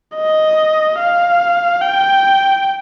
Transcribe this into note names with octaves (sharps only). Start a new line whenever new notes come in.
D#5
F5
G5